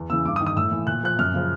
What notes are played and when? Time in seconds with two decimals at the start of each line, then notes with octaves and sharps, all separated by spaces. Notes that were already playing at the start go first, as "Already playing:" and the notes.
Already playing: E2
0.10 C#3 E3 E6
0.25 G2 D6
0.36 D#6
0.41 D#3
0.47 D#6
0.56 A2 E6
0.71 E3
0.87 A#2 F#6
1.03 F3 F#6
1.19 F#2 F6
1.34 C#3 F3